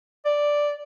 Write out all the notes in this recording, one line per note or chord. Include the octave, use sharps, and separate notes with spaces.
D5